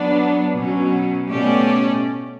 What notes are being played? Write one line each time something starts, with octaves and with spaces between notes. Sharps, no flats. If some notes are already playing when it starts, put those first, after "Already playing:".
Already playing: F#3 B3 D4
B2 F#3 C#4
B2 A3 C#4 G4 D5